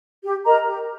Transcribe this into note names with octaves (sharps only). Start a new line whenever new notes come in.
G4
A#4 D#5 A#5
G4